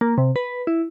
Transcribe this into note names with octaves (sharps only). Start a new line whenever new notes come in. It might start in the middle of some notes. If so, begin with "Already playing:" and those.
A#3
C3
B4
E4